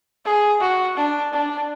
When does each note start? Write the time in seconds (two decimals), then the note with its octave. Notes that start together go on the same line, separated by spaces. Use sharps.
0.25 G#4
0.61 F#4
0.97 D4
1.33 D4